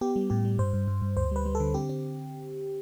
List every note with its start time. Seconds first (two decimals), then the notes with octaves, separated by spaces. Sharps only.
0.01 B3 G4
0.16 G3
0.30 A2 G4
0.45 G3
0.58 G2 C5
0.73 G2
0.88 G2
1.02 G2
1.16 D2 C5
1.31 G3 B4
1.45 G3
1.55 A4
1.60 D3
1.74 C4 G4
1.89 C4